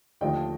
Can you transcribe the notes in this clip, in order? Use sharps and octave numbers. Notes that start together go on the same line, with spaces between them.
D#2 D3 F3 A3 D#5 G5